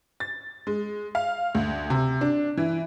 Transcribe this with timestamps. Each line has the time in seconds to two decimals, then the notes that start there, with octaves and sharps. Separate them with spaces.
0.20 A6
0.67 G#3
1.15 F5
1.55 D2
1.90 C3
2.21 D4
2.57 E3